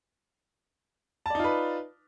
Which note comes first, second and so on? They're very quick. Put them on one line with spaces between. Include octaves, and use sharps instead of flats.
A5 D5 D#4 F4 B4